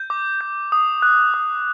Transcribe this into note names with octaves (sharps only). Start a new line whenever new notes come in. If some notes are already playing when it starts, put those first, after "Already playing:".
Already playing: G6
D6
G6
D#6
F#6
D#6